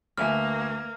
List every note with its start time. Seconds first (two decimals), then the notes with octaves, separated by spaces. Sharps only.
0.17 D2 A#3 B4 E5 G#5 F6